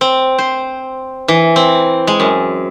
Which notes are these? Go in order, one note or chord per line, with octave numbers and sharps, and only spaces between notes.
C4
C5
E3
C4
G#3
F#2